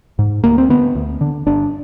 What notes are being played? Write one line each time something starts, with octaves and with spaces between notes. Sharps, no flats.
G#2
D2 A#3
C4
D3 B3
D2
D3
G1 D4